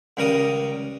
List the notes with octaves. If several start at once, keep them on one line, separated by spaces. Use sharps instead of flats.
C#2 C#3 G3 A#4 D6 D#6